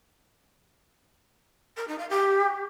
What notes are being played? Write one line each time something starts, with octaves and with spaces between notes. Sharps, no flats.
A#4
D#4
F5
G4